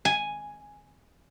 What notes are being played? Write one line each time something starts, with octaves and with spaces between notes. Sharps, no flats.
G#5